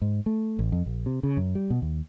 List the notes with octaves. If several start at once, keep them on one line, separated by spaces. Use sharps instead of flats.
G#2
A3
A1
F2
A#1
C3
C#3
F#2
G3
B2
D#2